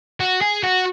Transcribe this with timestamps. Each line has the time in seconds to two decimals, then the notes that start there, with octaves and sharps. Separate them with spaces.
0.20 F#4
0.41 G#4
0.63 F#4